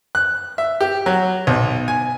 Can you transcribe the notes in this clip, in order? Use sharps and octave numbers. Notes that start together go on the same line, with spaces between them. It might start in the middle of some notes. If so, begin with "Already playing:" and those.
F#6
E5
G4
F#3
B1
G#5